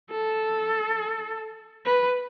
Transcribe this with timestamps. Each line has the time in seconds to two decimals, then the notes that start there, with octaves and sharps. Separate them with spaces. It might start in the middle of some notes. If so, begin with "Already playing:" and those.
0.10 A4
1.85 B4